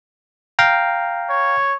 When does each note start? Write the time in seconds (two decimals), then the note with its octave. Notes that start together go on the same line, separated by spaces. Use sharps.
0.59 F5 G5 A#5
1.30 C#5